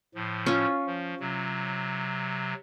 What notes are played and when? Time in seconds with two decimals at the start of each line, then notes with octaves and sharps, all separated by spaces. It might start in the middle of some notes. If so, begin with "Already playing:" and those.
0.15 A2 F3
0.46 C#4 F4
0.87 F3
1.20 C3 F#3